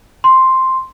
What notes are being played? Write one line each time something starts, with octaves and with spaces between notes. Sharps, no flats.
C6